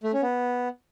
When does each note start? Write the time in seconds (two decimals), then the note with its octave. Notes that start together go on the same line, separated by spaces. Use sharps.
0.04 A3
0.13 C#4
0.23 B3